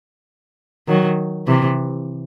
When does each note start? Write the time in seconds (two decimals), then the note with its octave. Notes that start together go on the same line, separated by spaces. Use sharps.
0.88 D#3 F#3
1.47 C3 E3